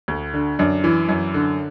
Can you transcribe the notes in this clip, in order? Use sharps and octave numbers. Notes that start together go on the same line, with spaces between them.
D2
D3
F#2 D4
E3
F#2
D3